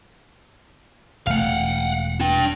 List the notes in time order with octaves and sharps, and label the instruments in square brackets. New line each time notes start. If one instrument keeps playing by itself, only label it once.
[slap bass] E1 A3 [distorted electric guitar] F5 F#5
[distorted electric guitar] D4 G5